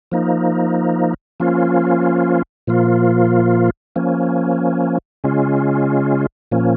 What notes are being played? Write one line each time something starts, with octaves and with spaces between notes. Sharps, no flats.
F3 A#3 D#4
F3 A#3 C#4 F4
A#2 F3 A#3 F4
F3 A#3 C#4
C#3 G#3 C#4 F4
A#2 F3 A#3 C#4